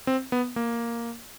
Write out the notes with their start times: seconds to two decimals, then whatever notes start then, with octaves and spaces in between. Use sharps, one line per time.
0.07 C4
0.32 B3
0.56 A#3